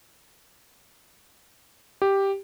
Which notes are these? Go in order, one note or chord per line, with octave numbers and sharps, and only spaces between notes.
G4